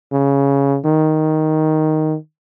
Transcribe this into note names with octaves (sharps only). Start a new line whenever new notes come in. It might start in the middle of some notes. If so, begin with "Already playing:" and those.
C#3
D#3